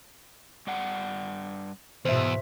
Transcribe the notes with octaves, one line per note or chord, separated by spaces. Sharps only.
G2 D5 F#5
E2 G#2 B2 C5 E5